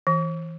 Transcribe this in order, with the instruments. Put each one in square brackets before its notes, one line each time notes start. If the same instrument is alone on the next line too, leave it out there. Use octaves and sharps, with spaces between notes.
[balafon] E3